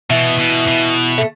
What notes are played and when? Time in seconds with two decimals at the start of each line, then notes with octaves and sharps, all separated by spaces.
0.10 B2 E3
0.39 B2
0.67 B2
1.18 A3